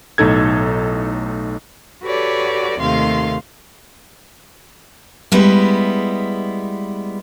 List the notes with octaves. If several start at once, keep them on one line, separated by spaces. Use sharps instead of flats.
B1 A2 D#4 A4 G#6
F#4 G4 A4 B4 C#5 D5
D#2 C3 D#3 A3 F5 C6
G3 G#3 B3 E4